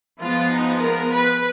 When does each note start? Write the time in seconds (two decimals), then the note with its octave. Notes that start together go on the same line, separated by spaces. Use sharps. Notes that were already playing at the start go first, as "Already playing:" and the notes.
0.19 F3 G#3 B3 F4
0.51 D#4
0.81 A#4
1.13 B4